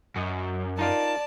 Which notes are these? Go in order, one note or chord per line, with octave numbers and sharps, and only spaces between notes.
F#2 F#4 D#5
D#4 F4 A#4 D5 A5